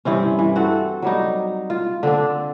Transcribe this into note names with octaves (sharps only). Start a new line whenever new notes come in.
G2 E3 C4 C#4
E3
C4 F#4 A4
F#3 G3 D#4
F4
D3 C4 D4